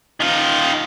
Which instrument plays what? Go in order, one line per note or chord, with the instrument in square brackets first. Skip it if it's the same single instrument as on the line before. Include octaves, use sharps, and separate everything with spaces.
[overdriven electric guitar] D#3 F4